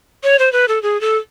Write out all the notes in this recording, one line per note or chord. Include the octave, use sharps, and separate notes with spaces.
C#5
C5
B4
A4
G#4
A4